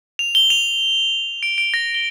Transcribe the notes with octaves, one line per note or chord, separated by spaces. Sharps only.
F7
G7
F7
D7
D7
A#6
G7